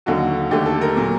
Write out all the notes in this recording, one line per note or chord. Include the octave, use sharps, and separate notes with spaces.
D#2 D3 F#3 F#4
D#2 D3 A3 G4
A4
A#4
A#2 F#3